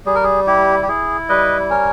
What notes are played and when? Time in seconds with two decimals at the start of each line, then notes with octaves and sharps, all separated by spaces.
0.06 G3 G#4
0.15 A#4
0.24 G#4
0.47 E4 G4
0.82 G4
0.88 E4 G#4
1.29 G3 B4 D#5
1.70 C#4 A#4 C#5